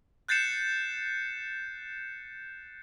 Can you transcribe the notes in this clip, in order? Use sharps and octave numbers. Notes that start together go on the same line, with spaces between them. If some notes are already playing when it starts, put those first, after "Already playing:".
F#6 G6 A6 C7 C#7 E7